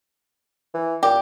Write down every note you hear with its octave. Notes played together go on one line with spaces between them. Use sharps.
E3
A#2 G4